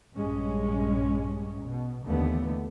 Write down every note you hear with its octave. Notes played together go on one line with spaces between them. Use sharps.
A#1 G2 G#3 C#4
B2
D#2 D3 E3 A3 B3